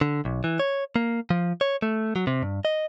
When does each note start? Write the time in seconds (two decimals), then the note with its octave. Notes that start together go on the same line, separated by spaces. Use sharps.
0.01 D3
0.25 B1
0.44 E3
0.59 C#5
0.96 A#3
1.30 F3
1.61 C#5
1.82 A3
2.16 F#3
2.27 C3
2.42 G2
2.65 D#5